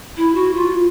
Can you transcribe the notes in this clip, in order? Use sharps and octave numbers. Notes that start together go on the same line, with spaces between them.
E4
F#4
F4